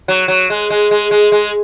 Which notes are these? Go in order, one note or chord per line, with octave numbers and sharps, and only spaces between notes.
F#3
F#3
G#3
G#3
G#3
G#3
G#3